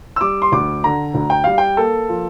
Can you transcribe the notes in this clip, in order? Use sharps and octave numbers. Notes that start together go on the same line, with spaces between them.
E6
G3 D6
C6
D2 D6
D3 A#5
D2
G5
G3 F5
G5
A#3 A4
F3